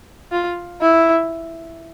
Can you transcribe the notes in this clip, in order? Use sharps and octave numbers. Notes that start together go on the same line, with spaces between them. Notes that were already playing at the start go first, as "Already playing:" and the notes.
F4
E4